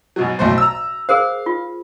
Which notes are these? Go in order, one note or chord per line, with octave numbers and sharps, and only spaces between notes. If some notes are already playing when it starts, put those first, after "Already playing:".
G#2 B2 F#3
B1 A2 C5
A#5 E6
G#4 A#4 C5 F5
F4